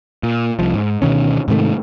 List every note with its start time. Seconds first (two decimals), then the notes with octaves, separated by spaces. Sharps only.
0.23 A#2
0.59 C2 F3
0.74 G#2
1.02 D2 B2 D#3 C#4
1.48 G#2 C3 D#3 A3